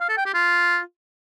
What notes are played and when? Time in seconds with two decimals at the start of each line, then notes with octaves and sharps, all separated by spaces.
0.01 F5
0.09 A4
0.17 G5
0.26 G4
0.34 F4